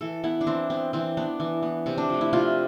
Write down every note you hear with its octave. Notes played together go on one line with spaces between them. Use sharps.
E3 A4
B3 E4
D4
E3 C4
B3 C4
E3 C4
B3 D4
E3
B3
C3 C4
D4
F3 A3
E4
C3 F4